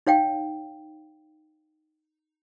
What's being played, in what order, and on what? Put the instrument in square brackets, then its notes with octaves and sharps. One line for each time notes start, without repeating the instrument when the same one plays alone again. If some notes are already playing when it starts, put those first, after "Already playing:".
[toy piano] D#4 C#5 F5 G5